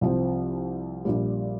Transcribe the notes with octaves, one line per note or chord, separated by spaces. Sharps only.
C2 C3 F3 C4
A#1 A#2 G3